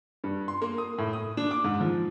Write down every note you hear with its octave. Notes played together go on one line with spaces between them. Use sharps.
G2
C6
A#3
D#6
A2
D#6
D4
D6
G#2
F3